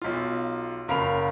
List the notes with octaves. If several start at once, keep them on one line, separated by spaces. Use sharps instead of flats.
B1 F4
F#1 A#4 F5 B5 F7